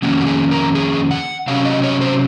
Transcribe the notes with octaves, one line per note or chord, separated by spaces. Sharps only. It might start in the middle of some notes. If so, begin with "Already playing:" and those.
F2 D#3 A#3 C#4 F#4
F#4
G#4
A#4
G#4
F#5
C3 F#3 C#4 F5
D#5
C#5
C5